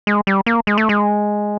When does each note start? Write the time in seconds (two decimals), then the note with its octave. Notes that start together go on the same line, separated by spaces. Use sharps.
0.07 G#3
0.27 G3
0.46 A#3
0.67 G#3
0.78 A3
0.89 G#3